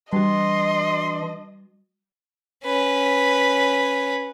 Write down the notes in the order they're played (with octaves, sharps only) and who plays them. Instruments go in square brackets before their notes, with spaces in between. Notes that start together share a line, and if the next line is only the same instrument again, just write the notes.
[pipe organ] E3 D4 [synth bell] G3 F#4 [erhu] D#5 [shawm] C6
[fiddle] C#4 B4